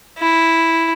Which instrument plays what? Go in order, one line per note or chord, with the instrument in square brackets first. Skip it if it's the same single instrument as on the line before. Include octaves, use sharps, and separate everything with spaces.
[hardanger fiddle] E4